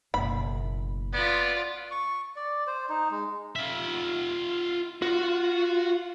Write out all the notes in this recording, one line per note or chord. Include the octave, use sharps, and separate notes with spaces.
F#1 B2 B5
B3 F4 D5
C#6
D5
C5
D#4
G#3
F4 E5
F4 F#4